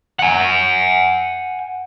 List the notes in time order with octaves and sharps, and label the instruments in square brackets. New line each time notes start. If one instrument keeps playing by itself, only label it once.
[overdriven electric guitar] F#5 G#5